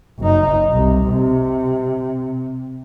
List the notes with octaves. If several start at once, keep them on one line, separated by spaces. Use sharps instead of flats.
F#1 D#4
C2
C3